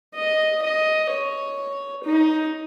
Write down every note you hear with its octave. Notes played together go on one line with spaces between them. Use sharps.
D#5
D#5
C#5
D#4